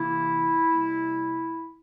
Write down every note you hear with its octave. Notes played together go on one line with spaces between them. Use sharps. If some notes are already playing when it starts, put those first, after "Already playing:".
Already playing: C3 E3 A#3 E4
C3 G3 A#3